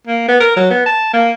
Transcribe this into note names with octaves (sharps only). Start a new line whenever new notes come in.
A#3
B3
A#4
F#3
B3
A5
A#3